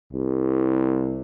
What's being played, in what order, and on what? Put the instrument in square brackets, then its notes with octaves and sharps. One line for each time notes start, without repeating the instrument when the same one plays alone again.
[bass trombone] C2